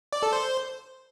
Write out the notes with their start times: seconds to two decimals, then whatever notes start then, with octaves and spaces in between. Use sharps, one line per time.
0.13 D5
0.23 A4
0.33 C5